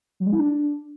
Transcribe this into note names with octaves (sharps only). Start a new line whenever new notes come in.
F#3
G#3
E4
D4